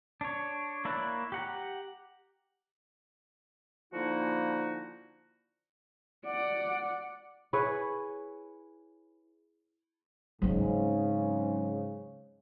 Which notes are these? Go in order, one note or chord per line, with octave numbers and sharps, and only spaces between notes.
D4 C#5
A#3 E4 C#5 D5 F#6
G4 F#5 A#5
D3 F3 A#3 D#4 E4 F#4
D5 F#5
E4 G#4 B4 C#5
G#2 C#3 F#3 C4